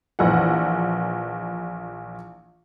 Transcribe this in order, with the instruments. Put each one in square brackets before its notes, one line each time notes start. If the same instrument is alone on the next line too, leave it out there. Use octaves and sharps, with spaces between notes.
[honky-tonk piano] A#1 E3 F#5